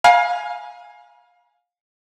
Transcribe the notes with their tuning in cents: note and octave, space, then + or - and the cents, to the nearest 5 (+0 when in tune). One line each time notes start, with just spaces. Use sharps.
F5 +25 G#5 +0 B5 -45